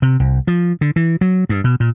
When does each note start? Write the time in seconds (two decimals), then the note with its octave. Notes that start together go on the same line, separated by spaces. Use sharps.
0.02 C3
0.20 C2
0.47 F3
0.81 D3
0.96 E3
1.21 F#3
1.49 G2
1.64 B2
1.80 A#2